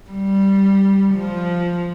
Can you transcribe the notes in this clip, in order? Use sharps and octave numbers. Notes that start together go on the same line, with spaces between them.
G3
F3